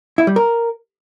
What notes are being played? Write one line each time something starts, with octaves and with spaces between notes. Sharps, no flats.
E4
G3
A#4